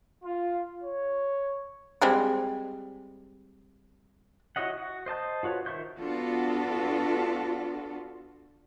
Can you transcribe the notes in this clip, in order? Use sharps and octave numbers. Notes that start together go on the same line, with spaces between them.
F4
C#5
G3 G#3 C4
E4 F#4 C#5 D#5 F#5
F#4
C5 D#5 A5 G6
F4 F#4 B4 C#5
D#3 C5 E5 C#6 G6
B3 D4 F4 F#4 A4